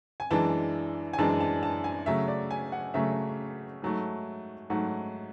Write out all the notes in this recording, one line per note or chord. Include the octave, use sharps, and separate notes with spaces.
G#5
F#2 E3 G#3 D4 A5
G#5
F#2 E3 G#3 D4 A5
A5
A5
G#5
C#3 F#3 A3 E5
D5
G#5
F#5
C#3 F#3 A3 E5
G#2 F#3 A3
G#2 F#3 A3 F#5